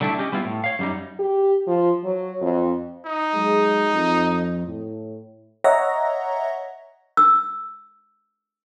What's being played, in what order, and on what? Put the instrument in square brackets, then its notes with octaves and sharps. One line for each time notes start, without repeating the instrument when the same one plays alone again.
[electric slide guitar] D3 G3 A3 D4 E4
C#4 G4 D#5
G3 B3 E4 F4
A2
C#5 F5
F#2 G3 D#4
[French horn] G4
F3
F#3
F2
[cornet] D#4
[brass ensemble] F#3 G#3
F2
A2
[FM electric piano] C#5 D#5 E5 F#5 A#5 A#6
[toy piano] E6